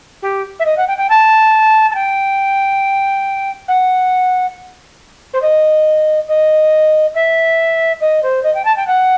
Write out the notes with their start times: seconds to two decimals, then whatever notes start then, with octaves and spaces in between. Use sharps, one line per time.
0.22 G4
0.59 E5
0.65 D#5
0.77 F#5
0.87 G5
0.98 G5
1.10 A5
1.90 A5
1.95 G5
3.68 F#5
5.33 C5
5.42 D#5
6.28 D#5
7.15 E5
8.01 D#5
8.23 C5
8.43 D#5
8.55 G5
8.65 A5
8.76 G5
8.87 F#5